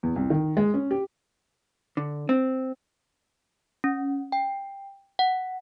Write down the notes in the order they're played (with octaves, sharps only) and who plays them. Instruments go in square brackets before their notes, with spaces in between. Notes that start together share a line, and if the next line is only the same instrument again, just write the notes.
[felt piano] E2
C2
D#3
G#3
C#4
G4
[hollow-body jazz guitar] D3
C4
[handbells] C#4
G5
F#5